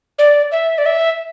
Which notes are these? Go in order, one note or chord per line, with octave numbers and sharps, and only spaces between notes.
D5
E5
D5
E5